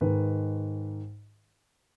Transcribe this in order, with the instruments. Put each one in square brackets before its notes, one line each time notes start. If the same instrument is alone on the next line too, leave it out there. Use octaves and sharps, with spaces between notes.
[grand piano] G#2 D#3 B4